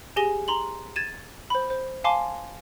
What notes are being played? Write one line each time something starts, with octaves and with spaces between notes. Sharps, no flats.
G4 G#4 G#5 A#6 G7
A#5 C6 F#7
G#6 A6 D#7 E7
C5 B5
C5
F5 G#5 A5 C6 D6